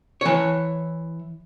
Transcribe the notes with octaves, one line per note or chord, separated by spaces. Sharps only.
E3 C#5